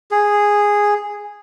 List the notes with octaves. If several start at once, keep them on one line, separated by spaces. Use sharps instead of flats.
G#4